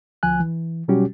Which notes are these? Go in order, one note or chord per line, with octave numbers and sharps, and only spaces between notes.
D2 F3 G#5 F#6
E3
B2 F#3 G3 C#4 F#4 G4